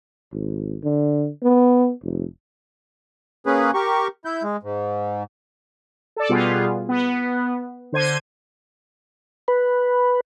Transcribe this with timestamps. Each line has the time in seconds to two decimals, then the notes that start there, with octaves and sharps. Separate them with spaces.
0.32 G#1
0.83 D3
1.43 B3
2.03 F1
3.46 A#3 C#4 G#4 B4
3.74 G4 A#4 C#6
4.25 E4 G6
4.43 G#3
4.63 G#2
6.16 A4 D5
6.29 B2 G3 B3 F4 G#4
6.89 B3
7.92 D3 C5 G#6 D#7
9.48 B4